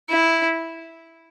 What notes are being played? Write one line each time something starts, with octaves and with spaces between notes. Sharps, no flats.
E4